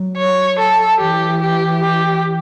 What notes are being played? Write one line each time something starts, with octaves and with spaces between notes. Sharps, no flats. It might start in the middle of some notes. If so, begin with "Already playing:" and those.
Already playing: F#3
C#5
A4
E3 G4
G4
G4